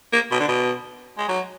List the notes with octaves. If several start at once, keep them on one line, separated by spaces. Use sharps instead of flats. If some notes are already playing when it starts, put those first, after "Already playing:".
A#3
B2
D3
B2
G#3
F#3